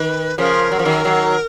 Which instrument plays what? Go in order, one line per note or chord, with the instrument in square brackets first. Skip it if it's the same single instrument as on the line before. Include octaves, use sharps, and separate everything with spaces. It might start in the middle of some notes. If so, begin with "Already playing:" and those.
Already playing: [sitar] D#3 [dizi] B4
[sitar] C#3 F3 [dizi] A#4
[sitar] F#3
F3
D#3 F#3
D#3 F#3